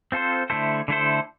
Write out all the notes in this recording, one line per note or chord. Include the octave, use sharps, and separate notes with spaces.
C4 F4 A4 C5
D3 A3 E4 A4 C5
D3 A3 E4 A4 C5